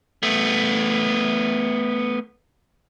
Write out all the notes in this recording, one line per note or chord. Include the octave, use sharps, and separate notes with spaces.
A3 B3